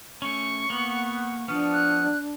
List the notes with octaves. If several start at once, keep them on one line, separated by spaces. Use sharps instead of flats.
A3 C#4 C#6
A#3 B3 F#5
F3 B3 D4 C#6 D#6 F6
F#6